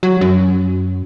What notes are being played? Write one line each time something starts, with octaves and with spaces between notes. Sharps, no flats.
F#3
F#2